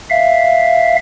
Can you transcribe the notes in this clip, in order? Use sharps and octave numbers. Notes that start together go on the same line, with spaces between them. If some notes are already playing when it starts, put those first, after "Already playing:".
E5 F5